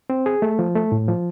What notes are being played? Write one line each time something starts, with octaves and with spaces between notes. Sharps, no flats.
C4
G#4
A3
F3
A3
A2
F3